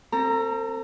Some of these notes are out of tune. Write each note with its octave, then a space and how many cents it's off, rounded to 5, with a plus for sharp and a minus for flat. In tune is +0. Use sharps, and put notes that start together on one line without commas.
C4 +10 A4 +40 A#5 +0